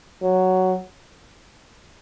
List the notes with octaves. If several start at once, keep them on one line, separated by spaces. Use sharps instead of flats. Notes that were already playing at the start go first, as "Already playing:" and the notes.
F#3